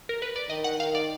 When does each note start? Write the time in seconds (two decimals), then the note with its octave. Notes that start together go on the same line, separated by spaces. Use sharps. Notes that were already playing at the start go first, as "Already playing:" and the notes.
0.09 A#4
0.22 B4
0.36 D5
0.49 D#3 D#5
0.64 F#5
0.80 D#3 F5
0.95 D5